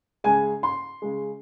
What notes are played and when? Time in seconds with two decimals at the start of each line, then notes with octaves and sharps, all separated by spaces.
0.24 C#3 G#3 G#5
0.63 C6
1.02 C#3 G#3